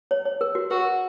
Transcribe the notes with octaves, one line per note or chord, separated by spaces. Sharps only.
C#5
C#5
A#4
F#4
F#4 A#4